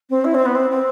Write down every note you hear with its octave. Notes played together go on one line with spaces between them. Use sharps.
C4
E4
C4
B3
C4
C4